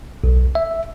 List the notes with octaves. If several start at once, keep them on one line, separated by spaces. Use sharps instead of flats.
B1
E5